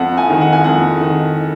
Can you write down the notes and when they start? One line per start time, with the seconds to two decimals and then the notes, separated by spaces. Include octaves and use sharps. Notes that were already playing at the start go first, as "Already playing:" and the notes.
Already playing: F2 F#5
0.17 G#5
0.29 D#3
0.41 F#5
0.53 G#5
0.64 F2 F#5
1.01 D#3